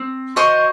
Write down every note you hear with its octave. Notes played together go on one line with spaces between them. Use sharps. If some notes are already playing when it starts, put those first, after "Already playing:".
Already playing: C4
F#4 C5 D#5